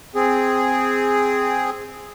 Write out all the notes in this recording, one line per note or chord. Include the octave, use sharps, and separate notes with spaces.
C4 G#4